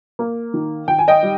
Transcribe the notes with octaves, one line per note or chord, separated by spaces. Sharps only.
A#3
D#3
D#3 G5
G#5
D#5 G5
G3